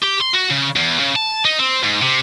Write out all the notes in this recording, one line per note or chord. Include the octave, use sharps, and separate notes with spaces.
G4
C6
F#4
C#3
E2
C#3
A5
D#4
C4
G#2
C3